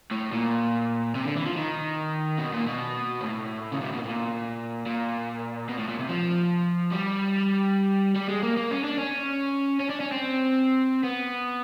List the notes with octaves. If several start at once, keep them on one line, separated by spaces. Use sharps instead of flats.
A2
A#2
C3
D3
E3
F3
D#3
B2
A#2
B2
A2
C#3
C3
B2
A#2
A#2
B2
A2
A#2
C3
F3
G3
G3
G#3
A#3
A#3
C#4
D4
C#4
C#4
D4
C#4
C4
B3